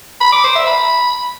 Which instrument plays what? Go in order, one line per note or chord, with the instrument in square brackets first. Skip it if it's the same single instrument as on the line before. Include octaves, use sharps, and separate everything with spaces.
[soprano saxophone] B5
D6
C5
E5
B5